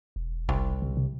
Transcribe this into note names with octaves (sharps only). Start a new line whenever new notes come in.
E1
F#1 C2
C3
C3